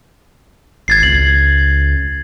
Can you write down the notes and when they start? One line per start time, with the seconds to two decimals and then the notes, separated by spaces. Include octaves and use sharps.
0.88 G#1 G#6 A6 C7
1.03 C#2 F#7